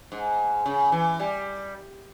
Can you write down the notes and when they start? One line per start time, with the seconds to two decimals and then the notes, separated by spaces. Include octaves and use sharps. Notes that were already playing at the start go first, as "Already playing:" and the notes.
0.12 G#2
0.66 C#3
0.92 E3
1.20 G3